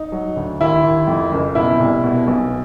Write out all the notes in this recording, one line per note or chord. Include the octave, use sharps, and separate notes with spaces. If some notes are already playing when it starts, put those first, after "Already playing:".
Already playing: D#4
F#3
D2
D#2 E4
D#2
F2
F#1
B2 E4
C2
B2
B1